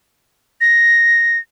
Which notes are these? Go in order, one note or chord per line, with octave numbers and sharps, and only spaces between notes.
A#6